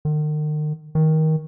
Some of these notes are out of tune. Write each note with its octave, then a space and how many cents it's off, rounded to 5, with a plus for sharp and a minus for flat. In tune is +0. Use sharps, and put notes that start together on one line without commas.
D#3 -40
D#3 +20